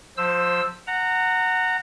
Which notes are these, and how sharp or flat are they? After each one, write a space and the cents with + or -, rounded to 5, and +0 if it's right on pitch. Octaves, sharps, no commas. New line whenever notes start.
F3 +25 C5 +0 E6 +0
F#5 +0 A#5 -25